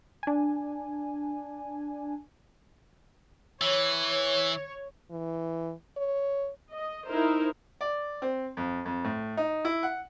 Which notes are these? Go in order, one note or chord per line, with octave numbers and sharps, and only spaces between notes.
D4 G#5
E3 C#5
E3
C#5
D#5
D#4 E4 A#4 C5
D5
C4
F2
F2
A2
D#4
E4
F#5